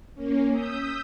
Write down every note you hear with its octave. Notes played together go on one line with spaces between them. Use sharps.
A#3 C#4
D#6 E6 G6 B6